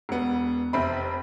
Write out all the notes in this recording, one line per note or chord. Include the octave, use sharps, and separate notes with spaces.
E1 B3
F1 C4 E5 B5